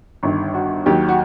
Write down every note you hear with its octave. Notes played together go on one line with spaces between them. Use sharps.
G1 G2 D#3
F#4
D#2 D#3 F#3 G4
F#4